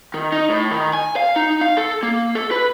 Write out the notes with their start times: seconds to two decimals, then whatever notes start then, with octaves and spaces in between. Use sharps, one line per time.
0.14 D#3
0.32 D#4
0.50 A2
0.71 D#3
0.94 G#5
1.16 F5
1.36 D#4
1.61 F5
1.77 A4
2.03 A#3
2.35 A4
2.51 B4